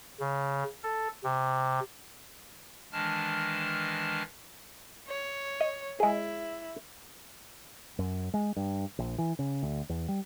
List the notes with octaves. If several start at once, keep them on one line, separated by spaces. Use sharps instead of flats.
C#3
A4
C3
D#3 E3 G#3 D4 A5 F6
C#5
D#5
G#3 E4 G#4
F#2
G#3
G2
A#1
E3
C#3
D2
E2
G3